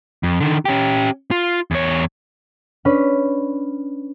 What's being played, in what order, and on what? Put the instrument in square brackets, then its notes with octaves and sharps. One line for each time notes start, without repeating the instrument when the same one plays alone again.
[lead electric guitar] F2
D3 D#3
C#4 G4
F4
E2 C#5
[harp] C#4 D4 B4 B5